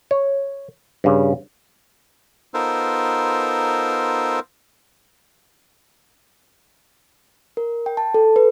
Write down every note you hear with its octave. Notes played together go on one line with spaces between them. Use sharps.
C#5
G2 C#3
B3 D#4 F4 A4 A#4 C5
A#4
G5
A5
A4
B4